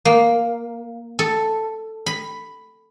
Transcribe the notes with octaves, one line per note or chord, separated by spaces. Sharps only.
A#3
A4
B5